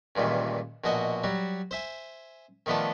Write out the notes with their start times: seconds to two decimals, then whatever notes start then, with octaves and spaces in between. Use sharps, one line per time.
0.16 C#2 G2 A#2 D#3 E3
0.84 A#1 B2 F#4 D#5 G#5
1.24 F#3 G3 F#4
1.71 C5 E5 G#5
2.66 D#3 F3 A3 B3 D4 A4